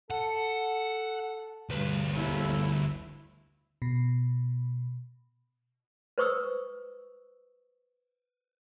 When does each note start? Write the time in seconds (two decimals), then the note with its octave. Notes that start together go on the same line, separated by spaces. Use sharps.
0.10 A4 F#5
1.69 D2 G2 B4
2.11 G1 D#2 E4
3.82 B2
6.18 B4 C5 C#6 D#6 E6